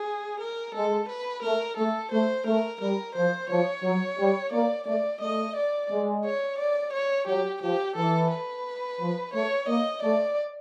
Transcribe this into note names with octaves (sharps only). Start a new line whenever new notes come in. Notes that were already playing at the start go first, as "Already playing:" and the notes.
Already playing: G#4
A#4
G#3 A4
B4
A3 A#4
A3 A4
A3 C5
A3 A#4
G3 A#4
F3 C5
F3 C#5
F#3
G3
A#3 D5
A3 D5
A3 D#5
D5
G#3
C#5
D5
C#5
F#3 G4
F3 G4
E3 A4
B4
F3
A3 C#5
A#3 D#5
A3 D5